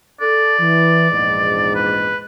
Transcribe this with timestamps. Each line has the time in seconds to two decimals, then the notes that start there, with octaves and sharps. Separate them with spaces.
0.21 A4 D5
0.59 E3
1.11 A#1 E2 G#2
1.75 B4